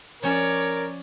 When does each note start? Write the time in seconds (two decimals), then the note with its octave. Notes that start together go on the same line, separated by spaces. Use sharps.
0.23 F3 C#4 A#4 C#5 D5 A5